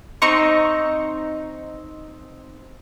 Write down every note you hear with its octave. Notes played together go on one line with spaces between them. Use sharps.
C4 D#4 C#6